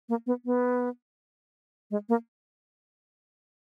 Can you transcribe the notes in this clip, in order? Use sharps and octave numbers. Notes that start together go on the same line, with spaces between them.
A#3
B3
B3
G#3
A#3